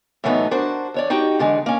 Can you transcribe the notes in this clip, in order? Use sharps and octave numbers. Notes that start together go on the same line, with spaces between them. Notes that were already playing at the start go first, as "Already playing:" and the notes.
A2 E3 F#3 A3 B3 D#4
D4 F#4 A#4 C5
E2 C#5 D5
D#4 F#4 G4 G5
E2 D3 G#3
A#3 C#4